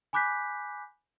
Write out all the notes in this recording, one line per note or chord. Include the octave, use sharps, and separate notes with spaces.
G#5 B5 D6 F#6 G6 B6